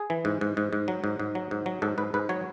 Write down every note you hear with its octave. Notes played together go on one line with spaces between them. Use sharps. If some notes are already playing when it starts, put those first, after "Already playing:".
Already playing: G#4
E3
G#2
G#2
G#2
G#2
F#3
G#2
G#2
F#3
G#2
F#3
G#2 A4
G#2 B4
G#2 B4
F#3 C#5